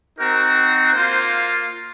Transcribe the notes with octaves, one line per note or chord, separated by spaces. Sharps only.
C4 D#4 F#4 A#4
A#3 F4 C5